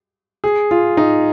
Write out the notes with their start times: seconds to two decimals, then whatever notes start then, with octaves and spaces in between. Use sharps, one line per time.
0.44 G#4
0.71 F4
0.97 D#4